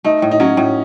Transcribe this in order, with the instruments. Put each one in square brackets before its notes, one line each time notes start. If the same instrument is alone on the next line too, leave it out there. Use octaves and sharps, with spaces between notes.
[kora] A3 [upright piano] D#4
[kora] A2
[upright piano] D#4
[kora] F#3 [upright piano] C#4
[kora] A2